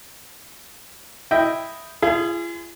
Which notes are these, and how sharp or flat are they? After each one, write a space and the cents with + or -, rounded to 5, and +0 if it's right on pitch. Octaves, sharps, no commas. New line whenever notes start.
E4 +0 D#5 +0 G5 +0
F4 -45 G#4 +0